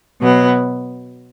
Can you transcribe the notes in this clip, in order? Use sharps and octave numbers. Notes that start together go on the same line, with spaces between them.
B2 F#3 B3